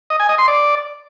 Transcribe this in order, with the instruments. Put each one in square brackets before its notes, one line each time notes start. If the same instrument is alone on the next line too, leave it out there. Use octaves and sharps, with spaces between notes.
[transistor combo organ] D#5
G#5
D#5
C6
D5